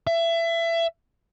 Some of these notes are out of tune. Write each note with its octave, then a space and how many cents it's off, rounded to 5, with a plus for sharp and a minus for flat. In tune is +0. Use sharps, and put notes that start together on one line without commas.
E5 +25